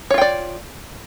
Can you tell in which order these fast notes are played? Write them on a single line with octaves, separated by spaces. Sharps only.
C#5 F4 G5 D5